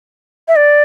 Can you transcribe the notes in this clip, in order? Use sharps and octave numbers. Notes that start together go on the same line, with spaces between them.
E5
D5